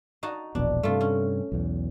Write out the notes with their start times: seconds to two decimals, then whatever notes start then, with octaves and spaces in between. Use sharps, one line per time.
0.23 D#4 F#4 A5
0.55 E1 A#1 B2 D4
0.83 G2 C3 A3 F4
1.01 C#4
1.52 B1 E2